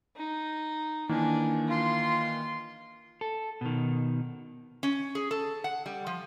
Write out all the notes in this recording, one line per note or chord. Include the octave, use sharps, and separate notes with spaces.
D#4
D#3 E3 A#3 D4 G#5
F4 C6
A4
B2 D#3
C#4
G#4
A4
F#5
G3
F3